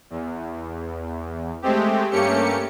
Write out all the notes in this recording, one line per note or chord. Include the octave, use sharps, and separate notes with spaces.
E2
G#3 A3 C4 G4
G2 A3 A#3 C#4 G4 C#7